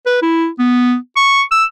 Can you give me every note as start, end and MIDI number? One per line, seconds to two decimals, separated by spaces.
0.06 0.18 71
0.22 0.48 64
0.59 0.95 59
1.16 1.42 85
1.51 1.64 88